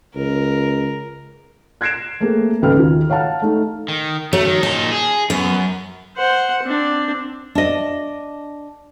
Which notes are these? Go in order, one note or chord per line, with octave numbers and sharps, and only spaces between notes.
C#2 A#4
F#6 G#6 A#6 C7 D7 E7
A3 A#3 C4 G#4 A#4
G#1 C#2 A4 B4 G5 F6
D#2 F4
C#5 F5 F#5 A5 F6
A3 D#4
D#3
F#3 A3
D#3
A#2 D#4 A5
G#4
F#2 B3
C5 F#5
C4 D4
D4 D#5